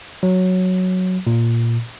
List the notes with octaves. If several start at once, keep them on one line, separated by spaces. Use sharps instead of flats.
F#3
A#2